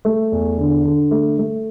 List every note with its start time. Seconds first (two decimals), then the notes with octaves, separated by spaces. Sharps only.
0.05 A3
0.32 E2
0.58 D3
0.85 D3
1.11 A3
1.39 A3